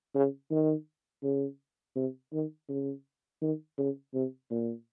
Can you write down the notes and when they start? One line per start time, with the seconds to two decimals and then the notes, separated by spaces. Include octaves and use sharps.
0.15 C#3
0.51 D#3
1.23 C#3
1.96 C3
2.33 D#3
2.69 C#3
3.42 D#3
3.78 C#3
4.14 C3
4.51 A#2